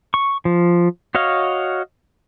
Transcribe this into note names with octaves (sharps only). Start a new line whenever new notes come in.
C#6
F3
F#4 C#5 D#5 F5